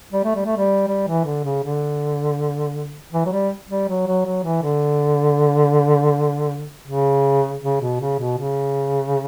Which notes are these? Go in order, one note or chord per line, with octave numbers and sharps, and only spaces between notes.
G3
A3
G3
A3
G3
G3
E3
D3
C#3
D3
E3
F#3
G3
G3
F#3
F#3
F#3
E3
D3
C#3
C#3
B2
C#3
B2
C#3